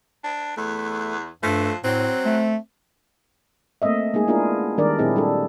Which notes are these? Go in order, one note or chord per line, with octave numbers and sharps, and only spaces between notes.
D4
E2 A3
G2 F3 A3
A2 F#3 C4
A3
A3 A#3 C4 D#5 E5
G#3 A#3 D#4 G#4
B3 D4 E4 F4 G#4 A#4
D#3 G3 G#3 D4 A#4 D5
A#2 F#3 C4 E4 G#4 D#5
G3 D4 A4